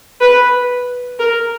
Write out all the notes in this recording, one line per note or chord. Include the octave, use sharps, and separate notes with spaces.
B4
A#4